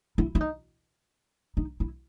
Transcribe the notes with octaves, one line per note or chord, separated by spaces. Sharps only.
E4
E4
D#4
D#4
E4